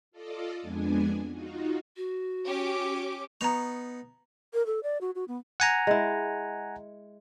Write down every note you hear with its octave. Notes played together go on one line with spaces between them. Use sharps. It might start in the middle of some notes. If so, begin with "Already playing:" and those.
F4 A4 D5 D#5
F2 G#3 B3 D4 G#5
D#4 F4 F#4
F#4
C#4 G4 D6
B3 D#4 A#5 C#6 F7
A#4
A4
D5
F#4
F#4
B3
F#5 G#5 A#5
G#3 E4